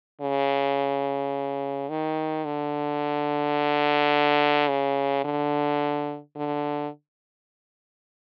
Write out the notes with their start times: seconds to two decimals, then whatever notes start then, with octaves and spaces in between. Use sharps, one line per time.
0.21 C#3
1.89 D#3
2.45 D3
4.68 C#3
5.25 D3
6.36 D3